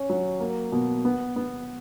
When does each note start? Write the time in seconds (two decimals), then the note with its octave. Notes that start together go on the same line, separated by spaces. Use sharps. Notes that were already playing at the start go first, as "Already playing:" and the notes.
Already playing: C#4
0.09 F#3
0.40 A#3
0.72 B2
1.05 B3
1.36 B3